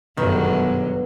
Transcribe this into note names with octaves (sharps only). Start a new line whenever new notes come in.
G1 F#2 B2 D3 D#3 F#3 G#3